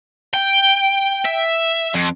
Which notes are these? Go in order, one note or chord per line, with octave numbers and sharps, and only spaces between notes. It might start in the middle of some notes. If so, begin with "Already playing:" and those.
G5
E5
F2